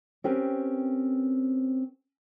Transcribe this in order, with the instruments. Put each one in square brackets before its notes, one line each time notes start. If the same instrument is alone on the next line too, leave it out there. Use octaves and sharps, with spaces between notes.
[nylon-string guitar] C4 C#4 G4 A#4 B4